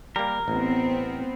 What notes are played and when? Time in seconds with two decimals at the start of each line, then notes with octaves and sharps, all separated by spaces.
0.16 G3 A#3 A#4
0.48 A1 B3 C4